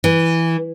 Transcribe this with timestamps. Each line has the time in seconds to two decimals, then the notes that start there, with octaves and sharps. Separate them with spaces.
0.04 E3